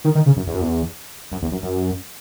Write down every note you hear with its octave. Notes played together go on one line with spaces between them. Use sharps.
D#3
D#3
C#3
F#2
E2
F#2
E2
F#2
E2
F#2
F#2